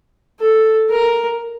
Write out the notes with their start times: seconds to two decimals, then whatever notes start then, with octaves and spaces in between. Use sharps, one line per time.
0.40 A4
0.90 A#4